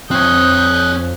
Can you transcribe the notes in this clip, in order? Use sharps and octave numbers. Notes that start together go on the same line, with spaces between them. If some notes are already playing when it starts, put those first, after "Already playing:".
F2 C4 C#5 D#6 F#6 G6